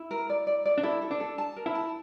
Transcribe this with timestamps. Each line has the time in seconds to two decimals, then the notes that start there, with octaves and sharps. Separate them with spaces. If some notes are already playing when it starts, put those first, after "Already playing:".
Already playing: E4
0.11 A#4
0.30 D5
0.47 D5
0.65 D5
0.78 D4
0.83 E4 A4
1.02 A4
1.11 D4
1.20 A4
1.38 A5
1.56 A#4
1.66 E4
1.75 A5